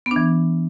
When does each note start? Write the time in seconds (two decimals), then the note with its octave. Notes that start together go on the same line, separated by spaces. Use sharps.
0.06 B3
0.11 D4
0.16 E3